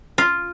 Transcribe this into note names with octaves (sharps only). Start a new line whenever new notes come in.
F4